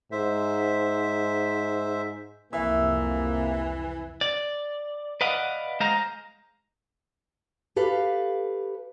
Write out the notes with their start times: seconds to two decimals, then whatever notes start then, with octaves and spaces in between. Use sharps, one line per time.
0.12 G#2 C5 E5
2.53 C2 F2 C3 E3 A#3 E5
4.21 D5
5.21 B4 D5 D#5 F5 F#5
5.80 G#3 C5 D#5 F5 A#5
7.76 G4 A4 B4 F5